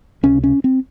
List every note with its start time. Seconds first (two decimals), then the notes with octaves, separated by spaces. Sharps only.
0.23 C#2 C3 C#4
0.44 C#4
0.64 C4